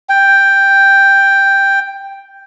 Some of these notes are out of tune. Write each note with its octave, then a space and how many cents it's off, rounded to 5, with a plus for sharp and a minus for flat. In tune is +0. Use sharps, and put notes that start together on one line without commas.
G5 +5